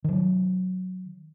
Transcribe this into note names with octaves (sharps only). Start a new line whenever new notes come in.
D#3 F#3